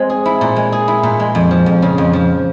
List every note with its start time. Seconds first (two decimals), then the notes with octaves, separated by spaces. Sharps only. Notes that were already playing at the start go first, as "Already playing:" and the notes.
Already playing: G#3 C4
0.10 G#4
0.25 E4
0.41 A#2
0.56 G#3
0.72 G#4
0.88 E4
1.03 A#2
1.20 G#3
1.35 F2
1.51 F3
1.66 F2
1.82 C#3
1.98 F2
2.13 F3